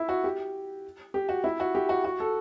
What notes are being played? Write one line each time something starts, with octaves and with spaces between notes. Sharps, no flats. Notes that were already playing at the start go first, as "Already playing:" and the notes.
Already playing: E4
F#4
G4
G4
F#4
E4
F#4
G4
F#4
F#4
A4